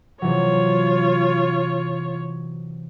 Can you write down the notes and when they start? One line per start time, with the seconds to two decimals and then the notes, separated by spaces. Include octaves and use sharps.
0.22 C3 E3 F#3 F4 C#5